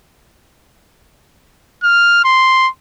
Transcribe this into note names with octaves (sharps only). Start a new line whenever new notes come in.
F6
C6